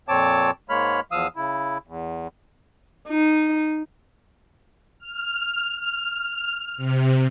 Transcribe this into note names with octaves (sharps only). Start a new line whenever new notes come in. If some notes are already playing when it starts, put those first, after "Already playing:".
F2 A#2 C4 C#5 A5 D6
G#2 G#3 A#3 C#5 B5 F6
E2 F3 F5 D#6 E6
C#3 E4
E2
D#4
F6
C3